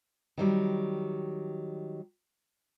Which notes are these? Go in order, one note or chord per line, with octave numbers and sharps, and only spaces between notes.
D#3 F#3 G3